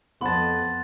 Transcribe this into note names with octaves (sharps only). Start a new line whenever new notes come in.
F2 B3 A5 C6 A6